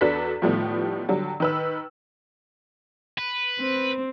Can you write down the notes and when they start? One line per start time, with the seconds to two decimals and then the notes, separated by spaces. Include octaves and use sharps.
0.01 E2 D4 F#4 A4 B4 B6
0.42 A2 D#3 F3 G3 A3 B3
1.08 D3 F#3 G3
1.40 D#3 B4 E6
3.18 B4
3.59 C4